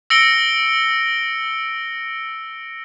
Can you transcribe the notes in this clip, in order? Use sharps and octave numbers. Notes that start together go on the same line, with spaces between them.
E6 A#6 C#7 D7 G7